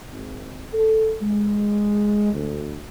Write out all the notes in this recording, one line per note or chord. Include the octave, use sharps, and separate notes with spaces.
G#1
A4
G#3
D2